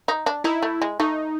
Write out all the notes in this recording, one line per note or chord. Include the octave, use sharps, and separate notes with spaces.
D#4
D4
D#4 E4
A3
G#3
A3 D#4